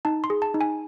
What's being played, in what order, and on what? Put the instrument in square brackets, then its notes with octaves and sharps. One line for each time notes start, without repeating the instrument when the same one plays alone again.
[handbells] D#4 A5
C6
G#4
A5
D#4
G#5